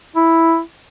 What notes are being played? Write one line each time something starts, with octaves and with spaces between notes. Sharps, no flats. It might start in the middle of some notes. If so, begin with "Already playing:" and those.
E4